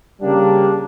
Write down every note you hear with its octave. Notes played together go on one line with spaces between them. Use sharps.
C#3 G3 A#3 D4